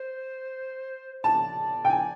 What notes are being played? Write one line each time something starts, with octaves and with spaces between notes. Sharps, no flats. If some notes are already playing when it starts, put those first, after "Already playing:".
Already playing: C5
D5 A5
G5
G#5